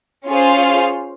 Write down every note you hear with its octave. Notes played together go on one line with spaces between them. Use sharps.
C#4 F4 G#4 C5 F5